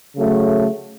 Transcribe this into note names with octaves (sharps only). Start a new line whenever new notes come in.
C#3 F#3 A3